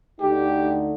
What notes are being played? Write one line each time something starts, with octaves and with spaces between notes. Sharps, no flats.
D2 D3 A3 D#4 G4